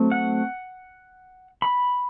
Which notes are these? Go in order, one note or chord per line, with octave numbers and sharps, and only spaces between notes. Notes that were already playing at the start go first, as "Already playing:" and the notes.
Already playing: F#3 A3 C4
F#5
B5